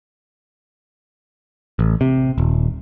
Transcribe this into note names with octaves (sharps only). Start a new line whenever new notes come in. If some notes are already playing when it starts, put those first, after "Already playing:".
A1
C3
D#1